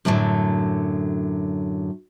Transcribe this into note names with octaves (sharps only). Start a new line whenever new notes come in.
F#2 A2 D3 E3 F#3